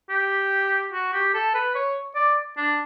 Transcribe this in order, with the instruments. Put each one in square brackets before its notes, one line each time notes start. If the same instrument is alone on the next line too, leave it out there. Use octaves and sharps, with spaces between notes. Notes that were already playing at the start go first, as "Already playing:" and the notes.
[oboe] G4
F#4
G4
A4
B4
C#5
D5
D4